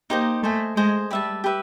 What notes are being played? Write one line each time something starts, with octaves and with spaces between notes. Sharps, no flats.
A#3 D#4 G4 C5 D#5
A3 C5 D#5 G#5
G#3 C5 D#5 G#5
G3 G4 B4 E5 A5
G4 B4 E5